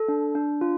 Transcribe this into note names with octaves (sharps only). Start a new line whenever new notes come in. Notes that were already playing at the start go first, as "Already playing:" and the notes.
Already playing: A4
D4
D4
F4